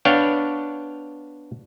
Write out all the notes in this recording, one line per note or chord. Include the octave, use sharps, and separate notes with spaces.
B3 D4 C#5 F5 G5